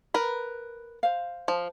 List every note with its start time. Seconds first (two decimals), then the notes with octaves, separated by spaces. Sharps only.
0.14 A#4 B4
1.03 C5 F5
1.48 F3